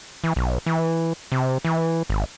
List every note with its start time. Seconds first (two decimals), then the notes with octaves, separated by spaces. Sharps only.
0.24 E3
0.36 B1
0.66 E3
1.32 C3
1.65 E3
2.10 G#1